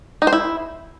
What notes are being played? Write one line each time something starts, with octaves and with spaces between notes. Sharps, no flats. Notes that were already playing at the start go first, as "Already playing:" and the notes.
D#4
C5
E4